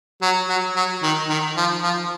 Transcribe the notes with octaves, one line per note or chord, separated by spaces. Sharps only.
F#3
F#3
F#3
D#3
D#3
F3
F3